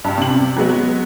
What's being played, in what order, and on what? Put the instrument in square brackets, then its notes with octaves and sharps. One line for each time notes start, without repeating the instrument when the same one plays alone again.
[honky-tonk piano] G2
C3 F#7
F#3 G#3 B3